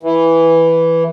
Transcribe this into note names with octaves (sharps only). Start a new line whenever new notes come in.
E3